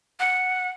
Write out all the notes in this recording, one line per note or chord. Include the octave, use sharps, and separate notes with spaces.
F#5